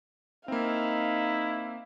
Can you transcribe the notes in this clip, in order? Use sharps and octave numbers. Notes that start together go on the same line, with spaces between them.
A#3 C4 D#4 E4 F5